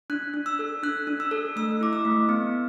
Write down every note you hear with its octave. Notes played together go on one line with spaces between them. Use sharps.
D4 F#6
D4
E6
A4
D4 F#6
D4
E6
A4
A3 E6
E4 D6
E6
A3
B3